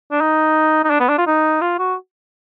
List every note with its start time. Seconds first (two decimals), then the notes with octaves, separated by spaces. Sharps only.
0.12 D4
0.21 D#4
0.84 D#4
0.90 D4
1.00 B3
1.09 D4
1.18 F4
1.27 D#4
1.61 F4
1.79 F#4